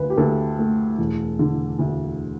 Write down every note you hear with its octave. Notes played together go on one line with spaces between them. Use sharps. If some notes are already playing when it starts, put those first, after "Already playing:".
Already playing: D2 B4
G4
D2 A4
A3
E1
D3
D2